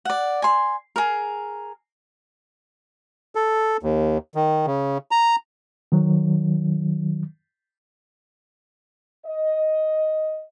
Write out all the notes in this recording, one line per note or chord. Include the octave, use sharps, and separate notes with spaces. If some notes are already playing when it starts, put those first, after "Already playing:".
D5 F#5
G#5 C6
G#4 A#4
A4
D#2
D#3
C#3
A#5
D#3 F#3
D#5